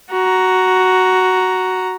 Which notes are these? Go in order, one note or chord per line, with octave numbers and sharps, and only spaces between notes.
F#4 A#5